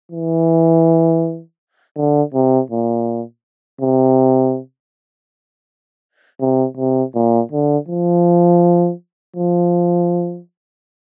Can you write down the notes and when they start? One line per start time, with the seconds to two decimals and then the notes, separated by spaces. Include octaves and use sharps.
0.11 E3
1.96 D3
2.34 C3
2.70 A#2
3.81 C3
6.40 C3
6.77 C3
7.14 A#2
7.51 D3
7.88 F3
9.36 F3